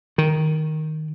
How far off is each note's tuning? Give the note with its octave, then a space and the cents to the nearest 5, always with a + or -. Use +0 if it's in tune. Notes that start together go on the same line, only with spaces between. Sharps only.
D#3 +0